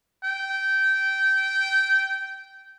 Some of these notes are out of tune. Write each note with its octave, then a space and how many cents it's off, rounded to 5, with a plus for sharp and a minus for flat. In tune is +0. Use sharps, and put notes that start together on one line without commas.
G5 -20